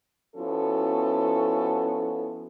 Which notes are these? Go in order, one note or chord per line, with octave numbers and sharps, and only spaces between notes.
F3 B3 C#4 E4 F#4 A4